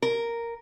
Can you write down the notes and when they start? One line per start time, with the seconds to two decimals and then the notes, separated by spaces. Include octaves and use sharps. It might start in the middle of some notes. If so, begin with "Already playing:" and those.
0.02 A#4